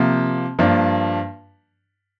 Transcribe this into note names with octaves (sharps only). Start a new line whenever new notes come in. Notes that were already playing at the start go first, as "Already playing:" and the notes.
Already playing: C3 F3 A#3
G2 F3 A#3 D4